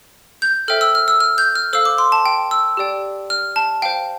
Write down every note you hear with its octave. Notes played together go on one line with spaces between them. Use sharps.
G6
A4 C5 E5 G5 F6
E6
F6
E6
F6
G6
F6
A4 C5 F5 E6
D6
C6
A5
G5
E6
G4 D5 G5
F6
A5
C5 F5 G5